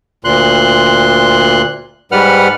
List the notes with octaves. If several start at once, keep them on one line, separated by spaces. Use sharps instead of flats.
D2 A#2 C6 F#6
G#2 G3 B4 F#5 F6